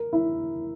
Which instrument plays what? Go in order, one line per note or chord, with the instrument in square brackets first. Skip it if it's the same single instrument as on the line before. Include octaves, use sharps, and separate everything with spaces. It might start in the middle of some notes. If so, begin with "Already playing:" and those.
Already playing: [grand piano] A#4
E4